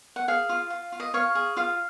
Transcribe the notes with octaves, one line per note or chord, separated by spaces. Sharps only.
F#5
G#4 F5
F4
F4
F4
D#5
C#5 F5
G#4
F4 F5